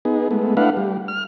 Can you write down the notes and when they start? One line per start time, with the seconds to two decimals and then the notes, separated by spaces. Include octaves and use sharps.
0.05 B3 D#4 G#4
0.31 G#3 A3 B3
0.57 A3 D4 E4 B4 F5 F#5
0.77 G3
1.08 F6